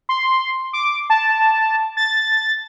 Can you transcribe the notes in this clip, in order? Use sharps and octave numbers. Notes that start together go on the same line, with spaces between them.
C6
D6
A5
A6